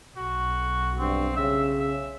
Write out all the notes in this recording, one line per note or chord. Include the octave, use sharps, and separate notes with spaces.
B1 F#4
G2 C4
C#3 E5
E5